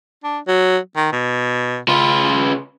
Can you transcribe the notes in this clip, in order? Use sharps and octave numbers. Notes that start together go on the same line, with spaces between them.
D4
F#3
D#3
B2
C#3 F4 B4